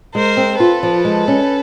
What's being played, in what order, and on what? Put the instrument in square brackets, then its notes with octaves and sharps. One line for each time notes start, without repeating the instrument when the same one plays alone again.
[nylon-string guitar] G#3 [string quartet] A#4 C5
[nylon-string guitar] C4
[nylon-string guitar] F4 [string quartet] A4 B4
[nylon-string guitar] F3
G#3
C#4